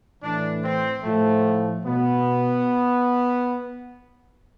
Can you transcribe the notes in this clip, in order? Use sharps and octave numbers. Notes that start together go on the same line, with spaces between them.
A2 E3 D4
C4
A2 F3 A3
B2 B3